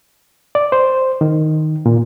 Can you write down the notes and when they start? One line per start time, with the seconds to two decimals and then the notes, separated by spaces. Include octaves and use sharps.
0.55 D5
0.72 C5
1.21 D#3
1.86 A#2